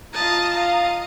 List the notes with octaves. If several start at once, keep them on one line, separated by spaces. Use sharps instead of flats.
F4 D#5 A5 A#5
D#5 F5